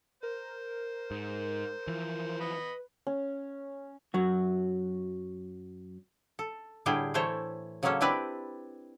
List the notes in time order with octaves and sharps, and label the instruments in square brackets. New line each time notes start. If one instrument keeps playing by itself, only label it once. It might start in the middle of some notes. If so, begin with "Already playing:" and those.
[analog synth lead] A#4 [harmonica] C5
[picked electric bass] G#2
E3 F3
[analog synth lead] B4 [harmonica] D#5 B5
[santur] C#4
[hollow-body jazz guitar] F#2 F#3 F#4
[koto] A4
A2 D3 G3 E4 G#4 G5
E3 A3 E4 A4 C5 C#5
C#3 F#3 G#3 A#3 C#4 A4
C4 D4 E4 G4 B4 D5